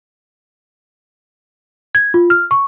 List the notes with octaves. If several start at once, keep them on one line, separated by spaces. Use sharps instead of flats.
G#6
F4
F6
C#6